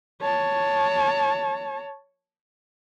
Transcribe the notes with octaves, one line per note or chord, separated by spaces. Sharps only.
C#5 A5